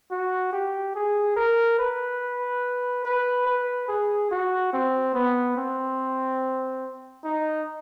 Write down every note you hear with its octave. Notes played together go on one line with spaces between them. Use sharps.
F#4
G4
G#4
A#4
B4
B4
B4
G#4
F#4
C4
B3
C4
D#4